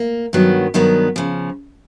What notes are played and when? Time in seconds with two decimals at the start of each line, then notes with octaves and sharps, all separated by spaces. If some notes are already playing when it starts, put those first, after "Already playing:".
Already playing: A#3
0.33 G2 D#3 F#3 B3
0.74 G2 D#3 F#3 B3
1.16 C#3 F3